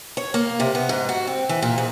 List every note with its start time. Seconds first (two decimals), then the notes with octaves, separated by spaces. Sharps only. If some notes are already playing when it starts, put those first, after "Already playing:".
0.17 C#5
0.34 A#3
0.60 C3
0.75 B3
0.89 G#2
1.09 F#4
1.27 C4
1.49 E3
1.62 A#2
1.78 G#2